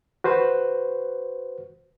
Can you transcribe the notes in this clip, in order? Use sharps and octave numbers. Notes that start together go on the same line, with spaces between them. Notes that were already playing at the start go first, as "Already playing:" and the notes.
F#4 B4 C5